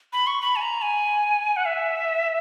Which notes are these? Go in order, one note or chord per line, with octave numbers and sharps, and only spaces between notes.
B5
C#6
B5
G#5
A#5
G#5
F#5
E5